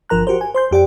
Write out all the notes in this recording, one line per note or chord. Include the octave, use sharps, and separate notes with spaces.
G1 F3 A#4 A#5 F#6
F#4 G4 A#4 C5
G#5
C5 C6 G6
F2 G4 D5 G5